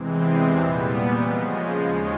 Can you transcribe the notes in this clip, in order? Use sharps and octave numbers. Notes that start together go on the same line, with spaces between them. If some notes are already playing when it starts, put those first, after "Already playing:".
Already playing: E2 C3 E3 G#3 C4
A#2 G3 B3
C#3 F3 G#3
D#2 D#3 G#3 C#4 F4